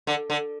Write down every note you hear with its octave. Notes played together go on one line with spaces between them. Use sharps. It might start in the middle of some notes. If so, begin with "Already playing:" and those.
D3
D3